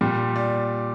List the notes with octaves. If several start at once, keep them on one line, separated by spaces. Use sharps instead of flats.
A#2 G3 G4
D5